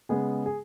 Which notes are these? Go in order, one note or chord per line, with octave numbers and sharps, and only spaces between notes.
C#3 G#3 B3 G#4
G#4